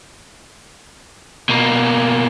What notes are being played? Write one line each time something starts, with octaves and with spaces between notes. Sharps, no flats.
B2 A#3